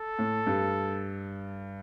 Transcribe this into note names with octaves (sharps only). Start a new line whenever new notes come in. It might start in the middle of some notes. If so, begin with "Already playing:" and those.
Already playing: A4
A2
G2